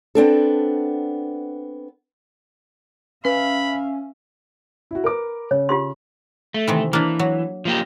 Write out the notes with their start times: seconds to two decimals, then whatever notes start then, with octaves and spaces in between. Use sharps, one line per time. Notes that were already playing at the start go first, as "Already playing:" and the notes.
0.15 B3 C4 D4 A4
3.25 C#4 B4 E5 F5 B5
4.91 E4 F#4
5.04 A#4 B4 D6
5.51 C#3 C#5
5.69 F4 G4 C6
6.54 A3
6.68 C3 D#3 E3
6.93 E3 A#3 D4
7.19 F#3
7.65 F3 A#3 G4